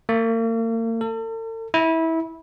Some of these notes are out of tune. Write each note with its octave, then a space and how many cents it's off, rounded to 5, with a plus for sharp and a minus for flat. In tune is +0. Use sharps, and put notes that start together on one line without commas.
A#3 -40
A4 +40
E4 -20